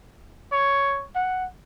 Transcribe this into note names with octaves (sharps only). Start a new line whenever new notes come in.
C#5
F#5